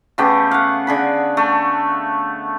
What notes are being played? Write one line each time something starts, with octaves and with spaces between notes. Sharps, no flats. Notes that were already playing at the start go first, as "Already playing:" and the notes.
C#3 A3 B3 G4
F5 F#5
D3 G#4 B5
A3